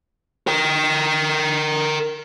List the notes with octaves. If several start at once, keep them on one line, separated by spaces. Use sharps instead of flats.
A#4 G5